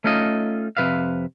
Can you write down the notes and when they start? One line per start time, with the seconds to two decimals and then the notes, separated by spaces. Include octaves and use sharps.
0.04 A3 C#4 D#4 F4 D#5
0.77 F2 C3 F#3 B4 E5 F5